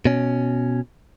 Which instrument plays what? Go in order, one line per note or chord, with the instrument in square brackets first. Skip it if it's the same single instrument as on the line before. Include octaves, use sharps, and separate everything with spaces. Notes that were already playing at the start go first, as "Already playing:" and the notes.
[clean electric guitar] B2 C#4